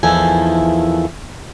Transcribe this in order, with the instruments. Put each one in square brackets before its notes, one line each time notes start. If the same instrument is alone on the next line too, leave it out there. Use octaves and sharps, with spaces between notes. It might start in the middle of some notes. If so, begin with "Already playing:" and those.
[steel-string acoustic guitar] E2 D#3 F3 E4 A4 G#5